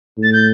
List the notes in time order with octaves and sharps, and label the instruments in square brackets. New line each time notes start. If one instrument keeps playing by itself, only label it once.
[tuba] A2 [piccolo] A6
[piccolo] G6